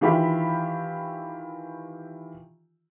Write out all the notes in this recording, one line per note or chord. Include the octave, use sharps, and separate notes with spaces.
D#3 E3 F4 G4 E5 B5